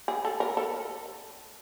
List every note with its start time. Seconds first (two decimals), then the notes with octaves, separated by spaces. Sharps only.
0.08 G#4
0.25 A4
0.40 A#4
0.57 A4